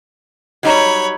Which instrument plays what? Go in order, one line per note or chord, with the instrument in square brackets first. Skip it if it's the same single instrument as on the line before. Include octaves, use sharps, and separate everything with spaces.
[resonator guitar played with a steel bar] F#3 G3 D#4 [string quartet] C#5 B5